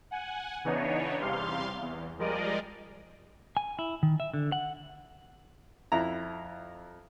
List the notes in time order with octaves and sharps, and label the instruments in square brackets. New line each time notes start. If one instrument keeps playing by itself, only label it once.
[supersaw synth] F#5 G#5
C#3 E3 B3 D4 D#4 C#5
E2 C3 G3 F5 C6
E2
F3 G3 G#3 A#4 D5 D#5
[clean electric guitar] G#5
E4
D#3
E5
D3
F#5
[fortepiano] F2 E4 A#5